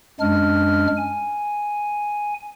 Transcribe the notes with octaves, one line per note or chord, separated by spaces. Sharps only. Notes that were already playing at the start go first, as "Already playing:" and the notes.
F#2 G#3 D4 F6
G#5